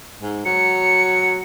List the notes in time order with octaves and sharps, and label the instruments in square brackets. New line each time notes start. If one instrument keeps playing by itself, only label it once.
[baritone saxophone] G#2
[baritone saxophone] F#3 [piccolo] C#7